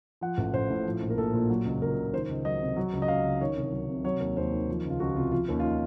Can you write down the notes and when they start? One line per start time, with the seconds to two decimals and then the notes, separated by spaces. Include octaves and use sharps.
0.21 F3 F#5
0.38 A1
0.53 A1 C5
0.70 A2
0.86 F3
1.02 A#1
1.10 A#4
1.18 A#1 A4
1.34 A#2
1.50 F#3
1.65 C#2
1.82 C#2 A#4
1.97 C#3
2.13 D#3 C5
2.29 C#2
2.45 F#3 D#5
2.61 C3
2.76 F#3
2.93 C#2
3.02 D#5
3.08 C#2 F5
3.25 C#3
3.41 D#3 C#5
3.57 C2
3.72 F#3
3.89 C3
4.04 F#3 C#5
4.20 D#2
4.37 D#2 C5
4.52 D#3
4.69 F3
4.85 C#2
4.90 F4
5.00 C#2 F#4
5.16 C3 F4
5.32 F3 F4
5.48 D#2 C#4
5.59 F4
5.64 D#4